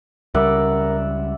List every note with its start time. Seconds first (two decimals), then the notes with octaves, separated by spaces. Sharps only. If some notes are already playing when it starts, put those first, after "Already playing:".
0.34 C#2 C#3 G3 A#4 D5 E5 F#5